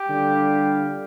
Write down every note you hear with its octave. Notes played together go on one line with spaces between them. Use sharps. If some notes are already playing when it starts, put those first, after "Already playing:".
Already playing: G4
D3 G3 D4 F4